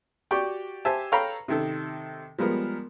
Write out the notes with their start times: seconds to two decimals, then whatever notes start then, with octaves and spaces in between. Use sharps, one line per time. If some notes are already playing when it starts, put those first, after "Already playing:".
0.31 F#4 G4 D5 G5 C#6
0.85 G4 C5 E5 G#5 A5
1.12 A4 C#5 F5 G5 A#5 B5
1.48 C3 D#3 A4
2.38 F3 G3 G#3 B3 A#4